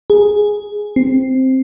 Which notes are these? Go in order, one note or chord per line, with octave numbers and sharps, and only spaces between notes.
G#4
C4